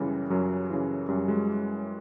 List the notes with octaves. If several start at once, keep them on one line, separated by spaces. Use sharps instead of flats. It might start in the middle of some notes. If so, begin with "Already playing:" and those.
Already playing: F#2 C#3 E3 G3
F#2 F#3
C#3 E3
F#2 G3
F#3 G#3